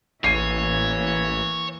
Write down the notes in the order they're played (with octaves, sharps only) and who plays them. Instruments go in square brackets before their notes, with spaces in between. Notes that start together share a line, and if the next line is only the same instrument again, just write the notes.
[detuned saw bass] A1 [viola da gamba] E3 A#3 [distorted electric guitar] C#5 [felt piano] C7 D#7